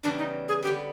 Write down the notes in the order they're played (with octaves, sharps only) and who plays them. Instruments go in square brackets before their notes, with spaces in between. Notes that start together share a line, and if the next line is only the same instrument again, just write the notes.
[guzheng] E2 C#3 E3 G3 [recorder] D4
[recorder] D#4
G#4
[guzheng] D3 G3 B3 [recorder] G4